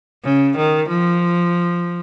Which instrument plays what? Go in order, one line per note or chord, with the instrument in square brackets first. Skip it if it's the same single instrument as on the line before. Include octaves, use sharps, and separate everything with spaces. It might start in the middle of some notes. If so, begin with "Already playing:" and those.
[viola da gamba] C#3
D#3
F3